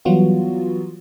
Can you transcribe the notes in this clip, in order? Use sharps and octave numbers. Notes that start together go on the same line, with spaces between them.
E3 F#3 G3 B3 F4 F#4